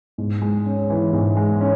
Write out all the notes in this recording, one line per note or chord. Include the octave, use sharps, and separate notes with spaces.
G#2
G#3
C#4
E3
G#2
G#3
C#4